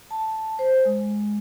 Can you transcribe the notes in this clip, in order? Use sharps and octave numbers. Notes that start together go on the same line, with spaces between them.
A5
C5
G#3